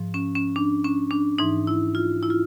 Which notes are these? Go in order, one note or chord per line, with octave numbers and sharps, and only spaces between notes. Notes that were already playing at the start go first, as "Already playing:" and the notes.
Already playing: G#2 F3
C#4
C#4
D4
C#4
D4
G#2 E3 D#4
E4
F4
E4
F4